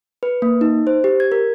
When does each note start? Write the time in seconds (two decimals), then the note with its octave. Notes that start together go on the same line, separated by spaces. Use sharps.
0.23 B4
0.42 A#3
0.61 D#4
0.87 C5
1.04 G4
1.20 G#6
1.32 A#4